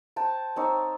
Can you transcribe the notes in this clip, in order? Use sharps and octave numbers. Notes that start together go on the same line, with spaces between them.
C5 G5 A5
C4 D#4 C#5